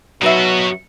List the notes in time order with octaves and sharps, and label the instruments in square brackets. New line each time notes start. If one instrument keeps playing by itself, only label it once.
[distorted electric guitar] B2 F#4 [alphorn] F#3 [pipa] D#4 B4 E5